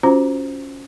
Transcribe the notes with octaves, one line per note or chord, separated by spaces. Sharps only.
C#4 F4 F#4 C5 A#5